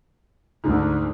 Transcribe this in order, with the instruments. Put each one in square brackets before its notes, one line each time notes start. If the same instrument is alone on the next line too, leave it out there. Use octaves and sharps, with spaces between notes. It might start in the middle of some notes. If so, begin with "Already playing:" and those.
[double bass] D2 D3 [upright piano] G#2